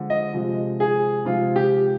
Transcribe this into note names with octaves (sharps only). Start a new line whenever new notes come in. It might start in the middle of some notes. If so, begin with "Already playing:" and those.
Already playing: D3 F3 G#3
D#5
C3 F3 G#3
G#4
C3 F3 G#3 F4
G4